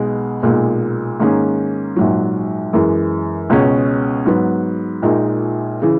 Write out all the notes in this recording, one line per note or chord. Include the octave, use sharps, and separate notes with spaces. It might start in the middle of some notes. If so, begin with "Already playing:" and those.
Already playing: B1 B2 G#3
B1 A#2 G#3
G#2 D#3 A#3 C#4 G#4
A#1 G#2 F#3
F#2 E3 G#3
C#2 B2 G#3 C#4
G#2 F#3 B3
A#1 A#2 G#3 D#4
C#3 E3